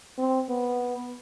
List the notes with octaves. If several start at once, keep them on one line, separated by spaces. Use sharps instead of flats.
C4
B3